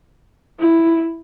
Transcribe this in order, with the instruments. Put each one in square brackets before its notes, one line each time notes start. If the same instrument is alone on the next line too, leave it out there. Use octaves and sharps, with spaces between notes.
[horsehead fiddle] E4